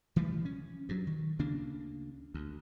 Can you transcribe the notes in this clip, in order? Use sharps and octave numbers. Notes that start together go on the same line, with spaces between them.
E3 F3 G3 A3
C#4
G2 F#3
D#3
D2 C#3 A#3 D4
D2